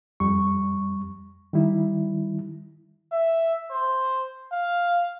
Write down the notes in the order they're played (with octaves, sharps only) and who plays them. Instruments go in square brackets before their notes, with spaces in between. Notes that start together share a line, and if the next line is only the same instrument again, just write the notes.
[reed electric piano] F2 G3 C#6
D#3 G3 E4
[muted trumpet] E5
C5
F5